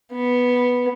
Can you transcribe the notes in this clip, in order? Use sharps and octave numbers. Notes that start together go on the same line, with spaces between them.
B3